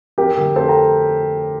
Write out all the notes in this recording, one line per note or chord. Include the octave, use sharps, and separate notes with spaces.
F2 G4 A#4
D3 A3
F2 A4 C5
G5 A#5